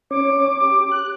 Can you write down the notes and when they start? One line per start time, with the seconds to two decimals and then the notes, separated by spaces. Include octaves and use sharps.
0.11 C#4 C#5 D6
0.61 G4
0.91 F#6